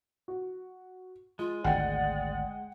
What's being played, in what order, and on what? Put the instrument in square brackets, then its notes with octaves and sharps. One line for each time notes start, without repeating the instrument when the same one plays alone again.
[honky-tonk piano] F#4
[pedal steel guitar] G#3 [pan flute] F4
[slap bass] G#1 D2 [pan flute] D5 [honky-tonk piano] F#5 G5